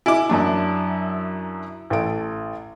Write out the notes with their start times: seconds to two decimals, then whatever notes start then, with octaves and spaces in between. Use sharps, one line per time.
0.06 E4 D#5 G#5 D6
0.29 F#2 F#3 D4
1.90 A1 A4 D7